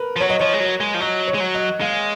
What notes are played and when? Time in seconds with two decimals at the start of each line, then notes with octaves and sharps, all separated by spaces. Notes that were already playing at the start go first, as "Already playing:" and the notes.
Already playing: A#4 B4
0.16 F3
0.20 F#3 C#5
0.30 D#5
0.39 F3 C#5
0.54 G#3
0.60 F#3
0.80 G#3
0.94 F3
1.01 F#3 D#5
1.27 C#5
1.34 G#3
1.40 F#3
1.54 D#5
1.81 G#3 F5